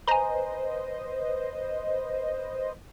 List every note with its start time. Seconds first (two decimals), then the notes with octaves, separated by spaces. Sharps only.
0.08 B4 C5 D#5 G#5 A#5